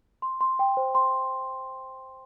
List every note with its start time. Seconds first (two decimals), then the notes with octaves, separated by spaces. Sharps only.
0.22 C6
0.41 C6
0.59 G5
0.77 C5
0.95 C6